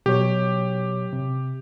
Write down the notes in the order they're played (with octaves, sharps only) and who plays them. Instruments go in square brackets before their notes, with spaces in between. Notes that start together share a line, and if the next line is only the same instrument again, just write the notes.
[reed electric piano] B2 F#3 C#5 [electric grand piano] G4
[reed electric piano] C3